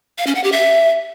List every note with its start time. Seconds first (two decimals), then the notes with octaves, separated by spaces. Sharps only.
0.18 F5
0.27 C#4
0.35 F#5
0.44 G4
0.52 E5